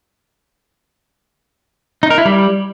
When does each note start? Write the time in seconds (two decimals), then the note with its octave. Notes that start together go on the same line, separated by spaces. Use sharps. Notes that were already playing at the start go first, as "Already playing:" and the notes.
2.03 D#4
2.10 A#4
2.18 E4
2.25 G3